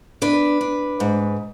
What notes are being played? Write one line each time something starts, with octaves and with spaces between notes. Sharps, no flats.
D4 B4
D4
G#2